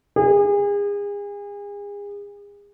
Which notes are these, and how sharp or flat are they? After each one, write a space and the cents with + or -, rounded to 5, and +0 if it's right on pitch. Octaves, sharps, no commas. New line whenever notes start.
G#4 -35